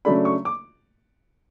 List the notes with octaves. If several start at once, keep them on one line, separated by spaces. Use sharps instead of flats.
C#3 F#3 A3 D4 B5
C#6
D6